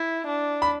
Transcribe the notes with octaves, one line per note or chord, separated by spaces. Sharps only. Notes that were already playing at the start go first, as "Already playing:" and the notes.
Already playing: E4
D4
B5